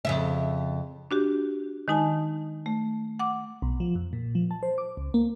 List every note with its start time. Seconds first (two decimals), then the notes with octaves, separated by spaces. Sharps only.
0.05 F2 C#3 E5
1.11 D4 F#4 G4
1.88 D#3 G#3 D#4 G#5 A5
2.66 A3
3.19 F#5 D6
3.62 B1
3.80 F3
3.95 F2
4.13 A#2
4.35 F3
4.51 A5
4.63 C5
4.78 D6
4.97 C#2
5.14 A#3